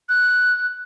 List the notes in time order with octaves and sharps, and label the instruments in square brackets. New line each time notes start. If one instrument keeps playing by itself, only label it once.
[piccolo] F#6